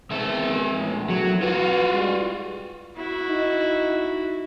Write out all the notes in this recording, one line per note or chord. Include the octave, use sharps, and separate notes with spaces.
D#3 E3 G#3 C4 E5
A#1 E2 A2
F#3
F4 F#4 B4
G3 G#3
E4 F#4
D#4